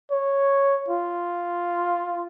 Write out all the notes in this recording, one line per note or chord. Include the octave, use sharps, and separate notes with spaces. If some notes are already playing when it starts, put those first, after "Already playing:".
C#5
F4